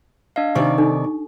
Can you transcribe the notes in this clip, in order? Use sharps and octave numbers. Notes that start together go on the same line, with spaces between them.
D4 D#5 F5
C3 D#3 D4 G4 D5 C#6
D4 D#4 A4